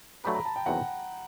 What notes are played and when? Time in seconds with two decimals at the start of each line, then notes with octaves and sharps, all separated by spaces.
0.24 F#3 A3 D4 G4 B4 B5
0.35 A#5
0.45 A5
0.56 G5
0.66 E2 C3 D#3 F#3 A#3 F#5